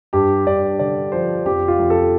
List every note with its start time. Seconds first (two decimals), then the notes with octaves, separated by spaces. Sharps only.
0.13 G2 G4
0.46 G2 D5
0.79 D3 D5
1.12 F3 C5
1.46 F2 G4
1.68 F4
1.79 F2
1.90 A4